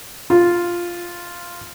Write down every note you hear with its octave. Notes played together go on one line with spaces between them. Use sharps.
F4